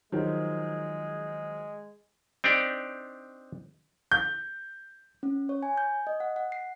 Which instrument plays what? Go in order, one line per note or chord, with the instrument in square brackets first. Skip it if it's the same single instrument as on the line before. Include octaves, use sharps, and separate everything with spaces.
[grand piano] D#3 F3 F#3 [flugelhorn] G#3
[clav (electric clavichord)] C4 D4 D#4 G4 D5
[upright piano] G6
[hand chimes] C#4
C#5
G#5
G6
D#5
F#5
F#5
C7